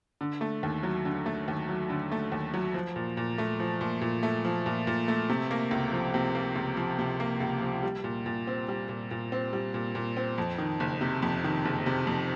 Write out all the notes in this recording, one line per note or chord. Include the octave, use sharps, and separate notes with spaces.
D3
A3
D#2
F#3
D3
A3
D#2
F#3
D3
A3
D#2
F#3
F3
A#2
A#2
A3
F3
A#2
A#2
A3
F3
A#2
A#2
A3
C3
A#3
C#2
F3
C3
A#3
C#2
F3
C3
A#3
C#2
F3
G3
A#2
A#2
C4
G3
A#2
A#2
C4
G3
A#2
A#2
C4
F2
D#3
F#1
C3
F2
D#3
F#1
C3
F2